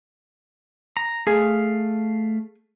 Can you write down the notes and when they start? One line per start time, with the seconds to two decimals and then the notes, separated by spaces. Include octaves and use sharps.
0.97 A#5
1.27 A3 G#4 F5